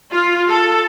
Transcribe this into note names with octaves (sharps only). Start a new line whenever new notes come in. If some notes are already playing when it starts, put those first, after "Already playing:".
F4
A4